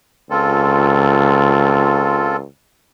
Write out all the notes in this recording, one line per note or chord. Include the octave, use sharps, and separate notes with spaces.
C#2 C4 F4 A4